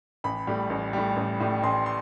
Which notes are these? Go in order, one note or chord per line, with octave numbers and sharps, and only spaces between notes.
A1 B5
A2 G3
A1
A2 G3
A1
A2 G3
A1 C6
C6